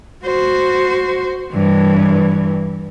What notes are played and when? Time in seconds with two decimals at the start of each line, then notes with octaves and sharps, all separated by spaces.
0.24 F#4 C5
1.53 G2 E3